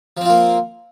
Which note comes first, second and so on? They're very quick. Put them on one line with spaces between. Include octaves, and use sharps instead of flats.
F3 C4 F4 A#3